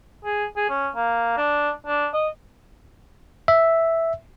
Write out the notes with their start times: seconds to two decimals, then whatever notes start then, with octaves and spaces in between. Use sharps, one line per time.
0.25 G#4
0.57 G#4
0.69 C#4
0.96 A#3
1.37 D4
1.87 D4
2.14 D#5
3.48 E5